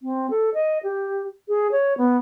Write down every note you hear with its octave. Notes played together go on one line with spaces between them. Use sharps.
C4
A4
D#5
G4
G#4
C#5
B3